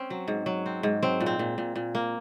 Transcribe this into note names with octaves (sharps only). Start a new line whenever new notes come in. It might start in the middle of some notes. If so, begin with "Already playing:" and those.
Already playing: C4 C#4
F#3
G#2
F#3
C4
G#2
F#3 C4
A#2
C4
A#2
A#2
A#2
A#3